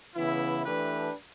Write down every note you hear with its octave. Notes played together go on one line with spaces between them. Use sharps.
C#3 E3 B3 E4
E3 A3 D4 G4 B4